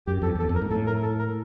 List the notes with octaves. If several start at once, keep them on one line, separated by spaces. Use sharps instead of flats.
F#2 G4
F2 A4
E2 A4
F2
A#4
G#2
A2 A4
A#4
A4
A#4